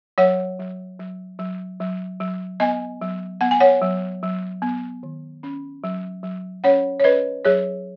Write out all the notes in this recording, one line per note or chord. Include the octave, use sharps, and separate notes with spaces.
F#3 C#5 F#5
F#3
F#3
F#3
F#3
F#3
B3 D#5 G#5
F#3
B3 F#5
G#5
C#5 F#5
F#3
F#3
B3
D#3
C#4
F#3
F#3
C#4 C#5 F#5
C#5
C#4 B4 D#5
F#3 G#4 C#5